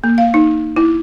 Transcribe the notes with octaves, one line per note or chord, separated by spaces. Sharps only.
A#3
F5
D#4
E4